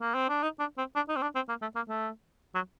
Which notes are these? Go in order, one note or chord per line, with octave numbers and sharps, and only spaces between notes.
A#3
C4
D4
D#4
D4
C4
D4
D#4
C4
D4
C4
A#3
A3
A#3
A3
F#3